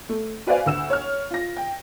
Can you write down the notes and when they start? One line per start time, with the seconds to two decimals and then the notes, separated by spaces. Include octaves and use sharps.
0.09 A3
0.47 F#4 B4 C5 D5 F5 G#5
0.66 D2 E6 E7
0.90 C#5 F6
1.30 F4 A#6
1.57 G5